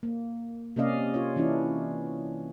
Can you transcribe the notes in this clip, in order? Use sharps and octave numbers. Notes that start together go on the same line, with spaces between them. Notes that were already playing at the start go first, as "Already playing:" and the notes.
A#3
C3 A#3 C#4 D5 D#5 F5
F4 C#5
E3 C#4 D4 E4